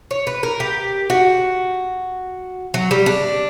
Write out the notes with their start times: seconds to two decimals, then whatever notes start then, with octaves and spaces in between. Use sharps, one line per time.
0.11 C#5
0.27 B4
0.43 A#4
0.60 G4
1.10 F#4
2.74 F#3
2.91 G3
3.06 D4